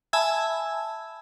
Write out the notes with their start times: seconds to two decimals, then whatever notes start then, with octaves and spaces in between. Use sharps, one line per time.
0.13 E5 G#5 A5 B5 E6 G#6